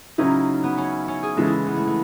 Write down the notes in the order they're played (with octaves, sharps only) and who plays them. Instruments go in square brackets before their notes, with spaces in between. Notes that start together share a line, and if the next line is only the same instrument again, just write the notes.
[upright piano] C#3 F#3 C#4 E4 [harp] D#4
[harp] B3
C#4
C#4
G#4
[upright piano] C#3 E3 G#3 [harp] A4
[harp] E4
B3
A3
A3